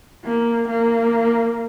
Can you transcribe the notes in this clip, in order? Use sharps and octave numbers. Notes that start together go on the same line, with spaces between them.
A#3
A#3